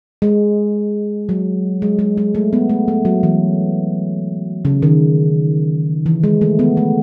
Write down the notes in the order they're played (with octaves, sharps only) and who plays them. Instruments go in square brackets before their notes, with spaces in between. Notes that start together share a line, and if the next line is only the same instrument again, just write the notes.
[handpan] G#3
F#3
G#3
G#3
G#3
A3
B3
A3
A3
F#3
E3
C#3
D#3
E3
G#3
A3
B3
A3